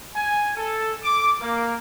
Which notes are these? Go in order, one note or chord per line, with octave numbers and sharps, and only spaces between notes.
G#5
A4
D6
A#3